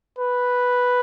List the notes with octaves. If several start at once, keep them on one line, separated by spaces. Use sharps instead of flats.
B4